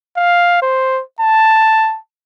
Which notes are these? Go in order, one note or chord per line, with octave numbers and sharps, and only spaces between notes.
F5
C5
A5